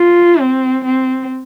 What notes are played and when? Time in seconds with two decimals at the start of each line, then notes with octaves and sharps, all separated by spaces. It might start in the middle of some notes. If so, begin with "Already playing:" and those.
Already playing: F4
0.39 C4
0.84 C4